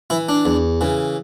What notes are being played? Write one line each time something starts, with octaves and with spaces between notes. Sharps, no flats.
E3 E4
D4
E2
C#3 E3